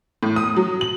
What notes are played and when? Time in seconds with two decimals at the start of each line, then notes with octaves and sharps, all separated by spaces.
0.23 A2
0.36 D#6
0.56 F#3
0.81 F#7